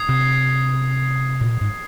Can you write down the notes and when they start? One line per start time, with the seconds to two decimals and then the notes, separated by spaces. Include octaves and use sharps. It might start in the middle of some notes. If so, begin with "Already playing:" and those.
Already playing: D#6 G#6 C7
0.09 C3
1.41 A#2
1.61 G#2